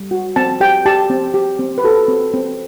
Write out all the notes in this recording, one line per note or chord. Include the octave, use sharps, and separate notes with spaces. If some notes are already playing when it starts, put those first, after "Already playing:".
Already playing: G3
F#4
C4 A5
G4 G5
G4 A5
C4
G4
C4
B4
F#4 A4
C4
C4